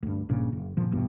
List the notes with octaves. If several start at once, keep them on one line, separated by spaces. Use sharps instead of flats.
D2 G2
A#1 G2 A#2 C#3
F#1
G1 A#2 F3
A#1 E2 G2 B2